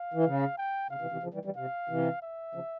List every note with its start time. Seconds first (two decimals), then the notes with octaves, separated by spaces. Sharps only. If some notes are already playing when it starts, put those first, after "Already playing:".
Already playing: F5
0.14 E3
0.25 C#3
0.57 G5
0.90 C#3 F5
1.01 C3 E3
1.12 C3 E3
1.23 C#3 F3
1.34 E3 G3
1.45 E3 G3
1.56 C3 F5
1.89 C3 E3
2.22 E5
2.55 C#3 F3